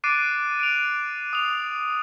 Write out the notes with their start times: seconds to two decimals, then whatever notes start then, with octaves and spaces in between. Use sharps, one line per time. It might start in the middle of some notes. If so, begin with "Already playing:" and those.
0.04 D6 F#6 A6 C7 D7 D#7
0.60 D7 F7
1.33 D#6 F7